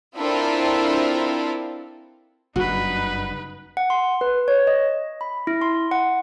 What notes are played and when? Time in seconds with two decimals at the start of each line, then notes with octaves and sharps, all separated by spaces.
0.17 C4 D4 E4 F4 A4 A#4
2.56 F#1 G2 D#4 F#4 B4
3.77 F#5
3.90 C6
4.21 B4
4.48 C#5
4.67 D#5
5.21 B5
5.47 E4
5.62 C6
5.91 F#5